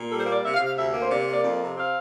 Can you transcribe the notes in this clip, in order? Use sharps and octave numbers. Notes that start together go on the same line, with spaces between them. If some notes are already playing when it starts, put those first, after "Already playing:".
Already playing: A#2
G3 A4
C5
A#3
D5
C3 E5
F5
C3
F5
D2 E5
A#3
C5
C3 D5
D5
A#3
D5
F2
C3
C4 F5